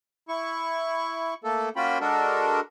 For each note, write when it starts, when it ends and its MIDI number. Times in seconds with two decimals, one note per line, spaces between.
0.29 1.34 64
0.29 1.34 85
1.44 1.69 57
1.44 1.69 58
1.44 1.69 69
1.76 1.98 58
1.76 1.98 61
1.76 1.98 65
1.76 1.98 66
1.76 1.98 79
1.76 1.98 83
2.01 2.60 56
2.01 2.60 62
2.01 2.60 66
2.01 2.60 69
2.01 2.60 70